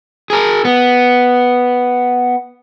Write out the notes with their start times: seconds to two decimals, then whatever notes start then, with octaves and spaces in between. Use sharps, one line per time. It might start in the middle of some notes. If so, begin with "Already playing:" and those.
0.30 G#4 A#4
0.65 B3